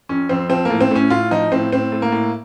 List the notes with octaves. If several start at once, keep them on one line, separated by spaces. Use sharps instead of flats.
F2 C#4
F2 C4
F3 C4
A#3
A2
C4
A2 C#4
A2 F4
F3 D#4
A2 C4
A2 C4
A2
A#3
A2